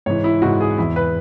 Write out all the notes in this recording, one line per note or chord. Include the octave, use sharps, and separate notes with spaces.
G#2 E3 C#5
E4
G#2 E3 F#4
G#4
E2 E3 E4
B4